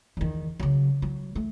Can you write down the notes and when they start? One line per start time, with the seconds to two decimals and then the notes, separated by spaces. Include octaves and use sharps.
0.17 E2 D#3
0.59 C#3 F#3
1.02 F#3
1.36 A3